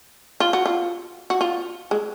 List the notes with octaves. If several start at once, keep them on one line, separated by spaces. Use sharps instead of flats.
F4
F#4
F4
F#4
F4
G#3